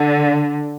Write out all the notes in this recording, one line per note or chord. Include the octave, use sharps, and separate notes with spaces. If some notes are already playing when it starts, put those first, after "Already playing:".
Already playing: D3